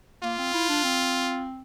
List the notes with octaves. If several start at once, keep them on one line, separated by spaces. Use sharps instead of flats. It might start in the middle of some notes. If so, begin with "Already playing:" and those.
A#3 F4
C4
E4
D4
C4